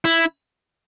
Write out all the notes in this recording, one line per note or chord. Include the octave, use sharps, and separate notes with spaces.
E4